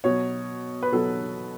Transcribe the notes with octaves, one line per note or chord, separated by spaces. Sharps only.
B2 F#3 C#5
B4
B2 F#3 A4